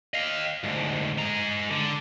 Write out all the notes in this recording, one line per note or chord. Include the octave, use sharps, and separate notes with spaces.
D#5 F5
D2 G#2
G#3 A#5
D3